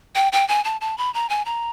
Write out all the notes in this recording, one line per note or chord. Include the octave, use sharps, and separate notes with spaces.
G5
G5
G#5
A5
A5
B5
A#5
G#5
A#5